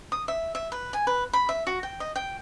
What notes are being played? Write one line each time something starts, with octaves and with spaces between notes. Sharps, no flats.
D#6
E5
E5
B4
G#5
B4
B5
E5
F#4
G5
D#5
G5